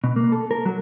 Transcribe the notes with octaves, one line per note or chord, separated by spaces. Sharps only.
B2
A#3
A4
A#4
F#3